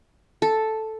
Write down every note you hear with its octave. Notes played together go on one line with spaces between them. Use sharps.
A4